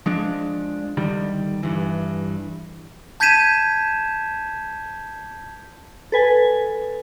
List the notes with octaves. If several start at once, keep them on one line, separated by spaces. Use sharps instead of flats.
F3 G#3 D4
D3 D#3 G3
G2 E3
A5 G6 G#6 B6 D#7 E7
A4 B4 G#5